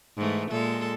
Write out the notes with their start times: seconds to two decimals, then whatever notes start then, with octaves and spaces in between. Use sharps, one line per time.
0.17 G#2 E3 A3
0.50 A#2 G#3 A4